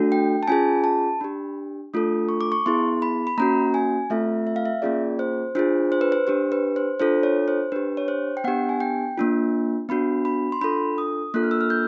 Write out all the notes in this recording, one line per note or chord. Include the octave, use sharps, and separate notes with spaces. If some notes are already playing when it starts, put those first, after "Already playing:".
Already playing: A3 D4 F#4 A4
G5
A5
C#4 F4 G#4 G#5
A5
D4 G4 B5
A3 D4 F4 A4 D#6
C#6
D6
C#6
B3 E4 G#4 C6
B5
B5
A#3 C#4 F#4 A#5
G#5
A3 C4 F4 A4 E5
E5
F5
E5
A#3 C#4 F4 G#4 D5
C5
D4 F4 G#4 C5
C5
B4
C5
D4 G4 C5
B4
C5
D4 F4 A4 C5
C#5
C5
D4 G4 B4
C#5
C5
G5
B3 D4 G4 F#5
G#5
G5
A#3 D4 F4
B3 D4 F#4 B5
B5
C6
D4 F4 A4 B5
D#6
A#3 D4 F4 A4 F#6
F6
E6
F6
G6